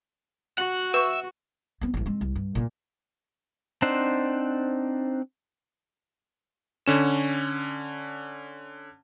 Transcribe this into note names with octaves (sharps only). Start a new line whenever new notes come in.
F#4 F#5
B4 E5 C#6
B3 C4
A1 G2
G#3 C4
C2
G2
A#2 A#3
C4 D4 D#4 C5 F#5
D3 C#4 E7